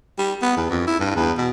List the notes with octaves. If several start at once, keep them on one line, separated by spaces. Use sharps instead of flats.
G3
B3
E2
F2
E4
G2
E2
B2